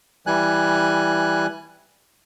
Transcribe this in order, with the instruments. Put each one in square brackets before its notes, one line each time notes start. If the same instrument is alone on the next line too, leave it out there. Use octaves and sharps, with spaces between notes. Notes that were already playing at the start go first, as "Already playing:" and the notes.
[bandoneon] E3 G3 G#5 F#6